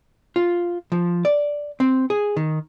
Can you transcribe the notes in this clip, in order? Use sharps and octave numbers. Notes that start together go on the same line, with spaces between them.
F4
F3
D5
C4
G#4
D#3